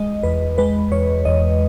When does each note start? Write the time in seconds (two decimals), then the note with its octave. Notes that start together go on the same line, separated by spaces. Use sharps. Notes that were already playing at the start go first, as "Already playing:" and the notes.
Already playing: G#3 D#5
0.23 E2 B4
0.58 G#3 B4
0.92 E2 C#5
1.25 E2 D#5